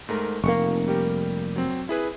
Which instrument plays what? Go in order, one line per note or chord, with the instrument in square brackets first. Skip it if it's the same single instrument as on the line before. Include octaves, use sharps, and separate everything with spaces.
[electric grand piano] G#2 A3 A#4
[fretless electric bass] F1 A#3 [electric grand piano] C#6 C#7
[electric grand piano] G3 G4 A#4
F#3 C4
E4 G#4 B4